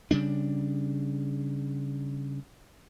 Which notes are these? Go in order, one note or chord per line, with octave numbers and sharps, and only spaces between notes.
C#3 G3 D4